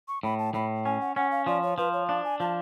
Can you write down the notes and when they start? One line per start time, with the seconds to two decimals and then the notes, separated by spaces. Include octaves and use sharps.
0.08 C#6
0.23 A2 B5
0.39 A5
0.54 A2 B5
0.85 C#4 G#5
1.01 F#5
1.16 C#4 F#5
1.31 F5
1.46 F3 D5
1.63 C#5
1.78 F3 B4
1.93 C#5
2.09 D4 F5
2.24 G#5
2.40 F3 A5